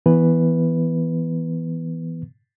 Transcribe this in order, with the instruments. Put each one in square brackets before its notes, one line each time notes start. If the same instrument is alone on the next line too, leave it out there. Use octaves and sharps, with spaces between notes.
[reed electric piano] E3 B3 B4